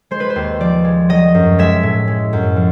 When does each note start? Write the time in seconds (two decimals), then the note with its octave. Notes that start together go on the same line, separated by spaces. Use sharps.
0.11 G#3 C5
0.20 B4
0.30 C5
0.36 D#2
0.60 F3 D5
0.84 G#3
1.09 F#3 D#5
1.34 F#2
1.59 G#3 E5
1.83 A2
2.08 G#3
2.33 F#2
2.56 F3